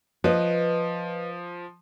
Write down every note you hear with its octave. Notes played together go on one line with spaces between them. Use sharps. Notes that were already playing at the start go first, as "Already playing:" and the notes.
F3 B4 D#5